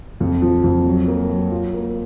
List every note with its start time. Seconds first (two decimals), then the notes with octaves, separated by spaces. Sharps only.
0.21 F2
0.42 F3
0.64 F2
0.85 F#3
1.07 A#3
1.29 F#3
1.51 F4
1.74 A#3